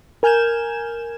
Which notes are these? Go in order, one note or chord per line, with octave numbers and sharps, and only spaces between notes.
A#4 G#5 F6 G6 G#6 E7